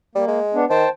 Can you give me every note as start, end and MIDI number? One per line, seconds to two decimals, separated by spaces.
0.15 0.25 55
0.15 0.39 58
0.28 0.61 56
0.54 0.65 59
0.54 0.65 62
0.70 0.85 51
0.70 0.89 72
0.70 0.89 79
0.70 0.89 81